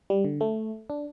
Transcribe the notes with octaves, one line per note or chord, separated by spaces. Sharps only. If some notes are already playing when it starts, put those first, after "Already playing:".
G3
D3
A3
D4